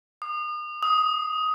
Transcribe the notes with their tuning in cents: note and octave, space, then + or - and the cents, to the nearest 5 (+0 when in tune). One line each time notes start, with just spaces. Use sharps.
D#6 -40
D#6 +15